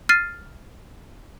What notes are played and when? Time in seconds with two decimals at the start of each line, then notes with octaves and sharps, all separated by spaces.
0.09 F6 A6 C7 D#7